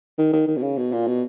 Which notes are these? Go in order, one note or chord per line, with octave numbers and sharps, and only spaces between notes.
D#3
D#3
D#3
B2
C#3
B2
A#2
B2